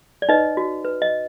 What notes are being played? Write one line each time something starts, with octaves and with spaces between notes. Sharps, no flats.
D5
D#4 B4 D#5
F#4
B4
D#5